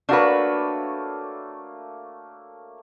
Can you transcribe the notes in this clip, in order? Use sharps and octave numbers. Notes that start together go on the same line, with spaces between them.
A3 A#3 D4 F#4 B4 C#5